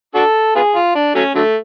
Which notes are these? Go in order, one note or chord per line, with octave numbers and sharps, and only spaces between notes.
D4 F#4 A4
B3 F4 G#4
F4
D4
F#3 A3 C#4
D3 F#3 A3